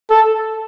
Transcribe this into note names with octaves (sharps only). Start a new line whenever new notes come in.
A4